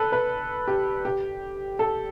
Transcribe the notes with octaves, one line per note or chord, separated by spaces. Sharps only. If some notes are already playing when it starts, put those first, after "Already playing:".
Already playing: A4 B4
B4
G4
G4
A4